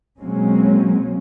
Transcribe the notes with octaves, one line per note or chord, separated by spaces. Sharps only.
B2 F#3 G#3 A#3 C4 C#4